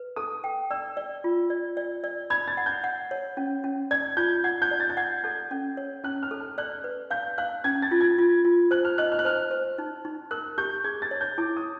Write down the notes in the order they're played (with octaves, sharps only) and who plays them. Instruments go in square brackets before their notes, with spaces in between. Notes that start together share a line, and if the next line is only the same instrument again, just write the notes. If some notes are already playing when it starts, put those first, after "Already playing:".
Already playing: [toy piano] B4
[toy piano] A4 [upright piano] D#6
[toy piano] G5
[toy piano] D5 [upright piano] E6
[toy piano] D5
F4
D5
D5
D5
[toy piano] B5 [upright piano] G#6
[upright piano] A6
[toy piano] F#5
[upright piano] G6
[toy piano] F#5
C#5
C#4
C#4
[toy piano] D5 [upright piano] G#6
[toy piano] F4 [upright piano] G6
[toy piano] F#5 [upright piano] G#6
[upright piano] G6
[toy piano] D5
[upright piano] A6
G6
[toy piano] F#5 [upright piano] G#6
[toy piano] A4 [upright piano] G6
[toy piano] C#4
C#5
[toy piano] C#4 [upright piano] F#6
[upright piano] F6
[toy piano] A4
[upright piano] F6
[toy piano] D5 [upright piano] F#6
[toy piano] B4
[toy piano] F5 [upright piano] G6
[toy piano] F5 [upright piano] F#6
[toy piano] C#4 [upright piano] G#6
[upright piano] A6
[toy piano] F4
[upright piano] G#6
[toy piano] F4
F4
[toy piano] C5 [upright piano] F#6
[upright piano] F6
[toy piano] D#5 [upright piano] F#6
[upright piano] F6
F#6
[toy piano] C5 [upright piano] F6
[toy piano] C5
D#4
D#4
[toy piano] A#4 [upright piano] F#6
[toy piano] G4 [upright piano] G6
[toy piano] G#4 [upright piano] G#6
[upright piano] A6
[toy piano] C#5
[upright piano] G6
[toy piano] E4 [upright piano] D6
[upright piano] D#6